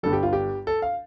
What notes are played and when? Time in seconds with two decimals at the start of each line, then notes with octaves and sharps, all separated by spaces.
0.03 G1 G2 D3 G3 A4
0.13 G4
0.23 F4
0.33 G4
0.67 A4
0.82 F5